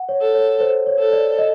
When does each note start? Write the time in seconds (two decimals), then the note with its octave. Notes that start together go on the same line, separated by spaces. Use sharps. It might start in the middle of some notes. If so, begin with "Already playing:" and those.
Already playing: F#5
0.09 C#5
0.21 A4
0.35 C#5
0.60 C5
0.87 C#5
0.99 A4
1.13 D5
1.39 D#5